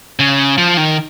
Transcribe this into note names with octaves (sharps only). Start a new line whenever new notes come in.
C#3
F3
D#3